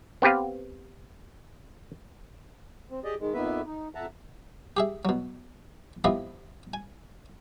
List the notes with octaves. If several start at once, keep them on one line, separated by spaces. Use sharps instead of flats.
B3 C4 G4 B4 F5
C4
G4 G#4 D5 D#5
D#3 G#3
F2 D#3 A#3 B3 B4 E5
D#4
F2 E5 F#5 A5 A#5
G4 G#4 E5
B2 F#3
F3 B3 C4 E4 G4 D#5
G#5